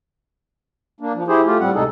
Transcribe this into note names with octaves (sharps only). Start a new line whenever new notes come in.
A#3 D4
F3
E4 G4 G#4 C5
A3 F4 G4
A2 G3 C4 F#5
D2 C3 G#3 D#4 G#4 A4